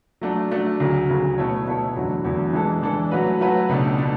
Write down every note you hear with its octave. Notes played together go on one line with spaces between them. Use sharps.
F#3 A3 D4
F#3 A3 D4
D2 C#3 F#3
D2 C#3 F#3
B2 A3 E4 A4 C#5
B2 A3 E4 A4 C#5
E2 D3 F#3 A3 E4
E2 D3 F#3 A3 E4
E3 G#3 D4 A4
E3 G#3 D4 A4
F#3 A3 C#4 F#4 B4
F#3 A3 C#4 F#4 B4
C#2 B2 A3 D4
A3 D4